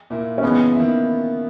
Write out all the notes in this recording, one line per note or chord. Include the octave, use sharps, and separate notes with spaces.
A#2 A#3 E4
C#4
C#3 E3 G#3 B3 D#4
D#3 A#3 E4